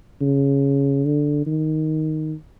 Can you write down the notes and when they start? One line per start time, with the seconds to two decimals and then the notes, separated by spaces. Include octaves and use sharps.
0.21 C#3
1.05 D3
1.47 D#3